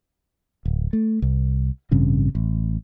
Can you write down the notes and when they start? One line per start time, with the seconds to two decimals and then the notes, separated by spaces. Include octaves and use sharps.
0.65 D1
0.93 A3
1.22 C2
1.91 A1 G2 C#3 C4
2.35 A1